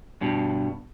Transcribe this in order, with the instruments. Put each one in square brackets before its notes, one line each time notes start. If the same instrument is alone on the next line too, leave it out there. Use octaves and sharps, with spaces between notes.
[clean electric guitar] G2 B2